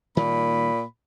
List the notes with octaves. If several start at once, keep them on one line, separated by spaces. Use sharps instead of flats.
A#2 D#3 G3 A#3 B5